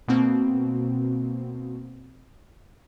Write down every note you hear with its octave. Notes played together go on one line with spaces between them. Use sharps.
B2 A#3 C4 F#4